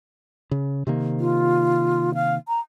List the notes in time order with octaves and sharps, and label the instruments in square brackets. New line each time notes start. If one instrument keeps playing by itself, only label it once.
[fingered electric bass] C#3
C3 D#3 A#3
[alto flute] F4
F5
A#5